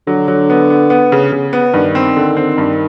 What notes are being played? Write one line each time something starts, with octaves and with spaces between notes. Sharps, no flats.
D3 F#3
F#3
B3
B3
B3
C#3
C#3
B3
G2 D#3
C4
D3
C4
G2